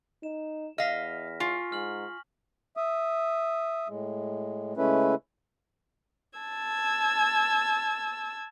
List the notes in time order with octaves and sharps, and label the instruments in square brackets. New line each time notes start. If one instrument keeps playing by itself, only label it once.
[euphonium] D#4 [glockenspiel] E7
[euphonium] E2 [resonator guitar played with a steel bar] D#5 F5 [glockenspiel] F6 A#6 B6
[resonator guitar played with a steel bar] F4 [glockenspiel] G#5 C#6 B6
[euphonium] G#2 [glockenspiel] F6 F#7
[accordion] E5 D#6
A2 G#3
C#3 G#3 A3 C#4 E4 B4
[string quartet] A5 E6 G#6